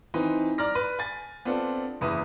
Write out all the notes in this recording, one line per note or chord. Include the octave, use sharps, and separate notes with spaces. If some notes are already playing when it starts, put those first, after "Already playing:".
E3 C4 D#4 B4
D5 A#5 F6 A#6
B4
G#5 A6
B3 C4 D4 F4 A4
F#1 E2 E4 B4 D#6